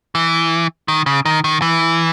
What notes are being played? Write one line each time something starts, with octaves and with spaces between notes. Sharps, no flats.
E3
D#3
C#3
D#3
D#3
E3